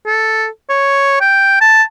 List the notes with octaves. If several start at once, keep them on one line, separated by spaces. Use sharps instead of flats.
A4
C#5
G5
A5